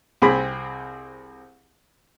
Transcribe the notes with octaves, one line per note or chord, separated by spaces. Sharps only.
C2 C4 G#4 B5